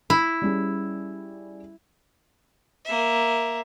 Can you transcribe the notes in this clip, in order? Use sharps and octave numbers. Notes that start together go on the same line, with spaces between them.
E4
G3 C#4 G#4
A#3 E5